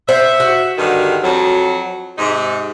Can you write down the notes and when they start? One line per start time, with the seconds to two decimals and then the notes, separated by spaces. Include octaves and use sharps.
0.09 C5 E5 F#5
0.40 F#4
0.78 G2 D3 D#3
1.24 F2 F#3
2.18 G#2 C3 D#4